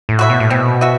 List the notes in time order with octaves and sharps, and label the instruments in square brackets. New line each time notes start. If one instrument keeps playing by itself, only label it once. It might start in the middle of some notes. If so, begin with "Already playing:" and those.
[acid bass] A2
[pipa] F#4 B4 E5
[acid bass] B2
A2
[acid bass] B2 [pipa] C4
[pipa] F#4 B4 E5